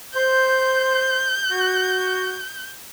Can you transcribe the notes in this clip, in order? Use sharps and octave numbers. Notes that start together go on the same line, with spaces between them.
C5 G6
F#4